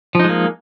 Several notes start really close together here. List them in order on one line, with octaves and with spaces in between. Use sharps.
F3 D#4 G#3 A#3